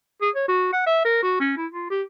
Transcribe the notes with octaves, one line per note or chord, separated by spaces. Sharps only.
G#4
C#5
F#4
F#5
E5
A#4
F#4
C#4
E4
F4
G4